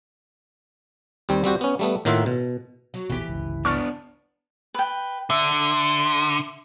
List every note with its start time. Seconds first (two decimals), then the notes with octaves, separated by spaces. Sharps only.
1.29 D#2 G3 C4
1.44 G3 C4 F#4 G4
1.61 B3 C#4
1.79 G3 A3 B3
2.05 A2 D#3 A#3 F4 E5 F#5
2.26 B2
2.94 F#3
3.10 A#1 D#2 B2 E3 G4
3.27 G1 C#2
3.65 B3 D4 C#6 F6 A6
4.74 B4 G5
5.30 D3 E5